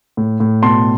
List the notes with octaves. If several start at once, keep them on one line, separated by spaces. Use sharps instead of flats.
A2
A2
B2 A5 C6